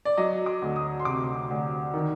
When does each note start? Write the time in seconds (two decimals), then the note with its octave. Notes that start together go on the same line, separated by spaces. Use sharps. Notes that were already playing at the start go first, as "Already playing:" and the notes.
0.05 D5
0.17 F#3 D#5
0.46 D6
0.62 D2
0.76 D#6
0.99 C6
1.05 C3 D6
1.50 D2
1.94 D#3